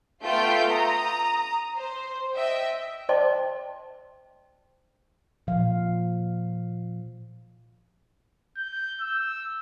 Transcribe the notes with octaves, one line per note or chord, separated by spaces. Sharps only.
A3 B3 F4 G5 C6 G6
A#5 D#6
C5
D#5 E5 G5
C5 D5 D#5 G5 A5 C6
A#2 F3 F5
G6
E6